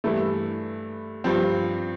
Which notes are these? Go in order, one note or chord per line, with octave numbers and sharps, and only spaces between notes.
G2 E3 A3 E4
G2 F3 C4